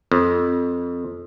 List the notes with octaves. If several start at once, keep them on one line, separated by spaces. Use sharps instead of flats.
F2